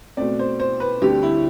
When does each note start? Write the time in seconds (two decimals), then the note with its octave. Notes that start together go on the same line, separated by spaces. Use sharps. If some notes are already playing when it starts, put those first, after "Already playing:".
0.17 B2 A3 C4 D5
0.39 C5
0.60 C5
0.80 B4
1.02 D2 D3 G3 C4 G4
1.23 E4